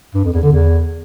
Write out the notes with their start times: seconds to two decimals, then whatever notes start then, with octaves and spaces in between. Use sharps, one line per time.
0.14 G2
0.24 F2
0.33 E2
0.43 D3
0.52 E2